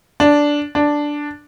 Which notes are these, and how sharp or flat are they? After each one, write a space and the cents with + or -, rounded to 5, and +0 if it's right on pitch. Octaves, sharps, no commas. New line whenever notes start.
D4 -5
D4 +0